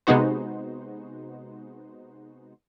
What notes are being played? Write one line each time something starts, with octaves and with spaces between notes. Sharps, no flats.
C3 G#3 B3 D#4 F#4 C5